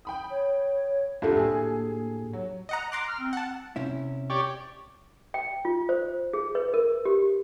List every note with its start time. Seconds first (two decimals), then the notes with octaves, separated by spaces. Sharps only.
0.05 G5 B5 D#6
0.30 C#5
1.22 C2 D4 F4 G4 A4
1.36 A2 A#3 G#4 G#5
2.33 F#3
2.69 D#5 F#5 A#5
2.92 A#5 C6 D6 F#6
3.08 F6
3.20 C4
3.33 F#5 A5
3.76 C3 C#4 E4
4.30 G4 C#5 D5
5.34 G5
5.65 F4
5.89 C5
6.33 G#4
6.55 B4
6.74 A#4
7.05 G4